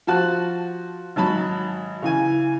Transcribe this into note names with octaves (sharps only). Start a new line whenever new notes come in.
F3 F#4 A5 F#6
G#1 F#3 A5 B5
C#3 E3 G#5